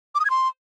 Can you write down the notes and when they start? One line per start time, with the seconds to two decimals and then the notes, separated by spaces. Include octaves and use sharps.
0.15 D6
0.20 D#6
0.25 G#6
0.30 C6